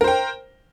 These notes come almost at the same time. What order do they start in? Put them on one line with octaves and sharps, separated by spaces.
A#4 C5 G5